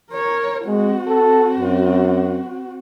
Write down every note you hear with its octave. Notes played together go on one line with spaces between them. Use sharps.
A#4 C#5
G#3 C4 F#4
A4
F#2